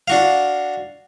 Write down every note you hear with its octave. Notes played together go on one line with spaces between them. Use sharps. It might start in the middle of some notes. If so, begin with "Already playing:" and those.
D4 F#4 F5